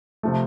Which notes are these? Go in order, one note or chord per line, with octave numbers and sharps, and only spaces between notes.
C3 F3 A3